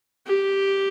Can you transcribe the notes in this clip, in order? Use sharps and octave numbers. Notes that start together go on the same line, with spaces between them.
G4